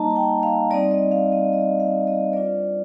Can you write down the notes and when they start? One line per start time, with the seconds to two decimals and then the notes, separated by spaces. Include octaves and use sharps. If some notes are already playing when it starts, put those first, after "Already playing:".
Already playing: G3 A#3 D#4 D#5 A5 A#5
0.11 A5
0.16 G5
0.43 F5
0.71 G3 C4 D#4 D5
0.91 D#5
1.11 F5
1.32 D#5
1.53 D#5
1.80 F5
2.07 D#5
2.29 C5
2.33 G3 D4 F4 D5